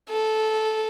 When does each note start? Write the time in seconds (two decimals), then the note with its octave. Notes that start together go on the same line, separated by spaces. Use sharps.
0.10 A4